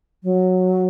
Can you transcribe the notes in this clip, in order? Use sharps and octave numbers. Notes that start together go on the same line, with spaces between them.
F#3